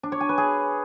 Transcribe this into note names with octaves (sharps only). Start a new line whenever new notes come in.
D4
C#5
G#5
B4
G#4